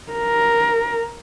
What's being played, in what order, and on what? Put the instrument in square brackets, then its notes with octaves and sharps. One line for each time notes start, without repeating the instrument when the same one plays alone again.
[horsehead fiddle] A#4